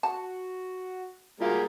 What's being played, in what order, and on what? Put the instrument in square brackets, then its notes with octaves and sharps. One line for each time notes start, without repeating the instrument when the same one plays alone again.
[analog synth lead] F#4 [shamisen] A5
[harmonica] G3 A#3 G#4 [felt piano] F4 F#4 F5